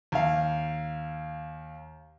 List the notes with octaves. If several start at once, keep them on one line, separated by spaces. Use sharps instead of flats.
D#2 F5